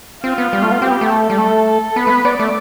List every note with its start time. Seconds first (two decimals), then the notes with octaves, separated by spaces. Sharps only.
0.24 C4 F4
0.38 B3
0.53 G3
0.62 A3
0.72 B3
0.82 C4 G4
0.91 B3
1.01 A3
1.10 A4
1.30 G3
1.38 A3 A4
1.68 A4
1.96 B3 B4
2.07 A3
2.10 B3
2.25 B3 D5
2.39 A3